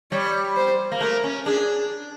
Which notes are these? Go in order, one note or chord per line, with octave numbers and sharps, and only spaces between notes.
G3 C#5
C5
A#3
A3 A#4
C#4
D4 G#4